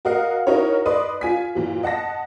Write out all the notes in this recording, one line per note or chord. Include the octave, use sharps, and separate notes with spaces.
F#4 A#4 D#5 F5 F#5
D#4 E4 F#4 A#4 C#5
B4 D5 D#5 C6 D#6
F4 G#5 B6
A#2 E3 F#3
D#5 F#5 A5 A#6